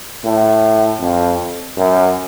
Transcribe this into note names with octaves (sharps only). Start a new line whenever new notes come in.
A2
F2
F#2